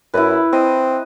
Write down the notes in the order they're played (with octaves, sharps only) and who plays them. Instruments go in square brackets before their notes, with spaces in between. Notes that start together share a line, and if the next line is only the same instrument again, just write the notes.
[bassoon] F#2 [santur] E4 B4
[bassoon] C4 [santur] D#5